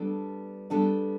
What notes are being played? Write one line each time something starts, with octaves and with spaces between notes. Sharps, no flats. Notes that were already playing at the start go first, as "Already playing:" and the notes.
Already playing: G3 B3 D4 A4
G3 B3 D4 A4